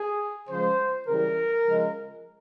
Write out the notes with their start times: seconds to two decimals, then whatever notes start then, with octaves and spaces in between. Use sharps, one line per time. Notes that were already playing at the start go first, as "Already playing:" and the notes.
Already playing: G#4
0.49 C#3 F3 G#3 C5
1.07 C#3 E3 G3 A#4
1.66 C#3 F3 G#3